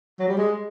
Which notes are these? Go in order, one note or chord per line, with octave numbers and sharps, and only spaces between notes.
F#3
G3
G#3